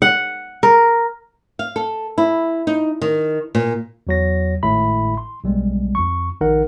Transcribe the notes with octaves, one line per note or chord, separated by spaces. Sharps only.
F#5
A#4
F5
A4
E4
D#4
D#3
A#2
E2 F#3 A#6
G#1 A2 E4 E5 B5
C6
B1 G3 G#3
F2 C#6
A#1 D#3 D#4 A#4 F#5